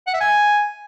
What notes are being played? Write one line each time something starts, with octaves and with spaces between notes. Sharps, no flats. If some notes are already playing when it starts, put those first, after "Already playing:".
F#5
E5
G#5